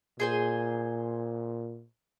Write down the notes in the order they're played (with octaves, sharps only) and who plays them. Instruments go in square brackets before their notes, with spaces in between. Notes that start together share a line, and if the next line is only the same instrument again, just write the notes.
[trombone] A#2 [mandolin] G#4 C5 G#5